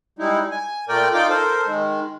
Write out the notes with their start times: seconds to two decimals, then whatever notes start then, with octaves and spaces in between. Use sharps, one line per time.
0.19 G3 G#3 D#4 E4
0.51 G#5
0.88 A#2 A3 A#4 D5 G5
1.14 D#4 F4 D5 G5 D6
1.29 A4 A#4 C5
1.66 D#3 G#3